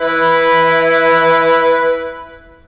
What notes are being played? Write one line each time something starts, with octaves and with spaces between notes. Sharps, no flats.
E4 B4